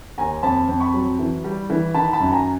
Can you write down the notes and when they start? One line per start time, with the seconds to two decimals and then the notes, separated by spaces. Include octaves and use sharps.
0.18 D#2 G#5 A#5
0.43 F2 A5 B5
0.68 F2
0.80 B5 C#6
0.94 F#3
1.19 E3
1.44 G3
1.70 E3
1.94 D#3 A5 B5
2.13 A5 B5
2.20 F#2
2.32 G#5 A#5